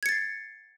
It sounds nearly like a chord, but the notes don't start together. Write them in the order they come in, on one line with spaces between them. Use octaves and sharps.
G#6 C#7 A6 C7